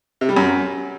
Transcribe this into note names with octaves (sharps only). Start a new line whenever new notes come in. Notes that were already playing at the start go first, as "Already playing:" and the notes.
C3
G3
F#2